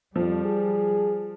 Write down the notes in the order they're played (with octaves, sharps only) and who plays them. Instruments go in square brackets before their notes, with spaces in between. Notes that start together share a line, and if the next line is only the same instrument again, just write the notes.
[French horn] F2 [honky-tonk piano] F3 [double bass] G3
[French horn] G#4